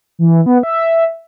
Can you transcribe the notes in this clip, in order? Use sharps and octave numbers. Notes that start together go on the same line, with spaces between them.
E3
B3
E5